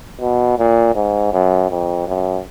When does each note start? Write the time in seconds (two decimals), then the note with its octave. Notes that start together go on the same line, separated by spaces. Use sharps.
0.21 B2
0.58 A#2
0.95 G#2
1.33 F#2
1.70 F2
2.07 F#2